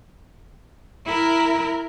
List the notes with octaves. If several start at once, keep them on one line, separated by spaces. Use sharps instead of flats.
E4 A#4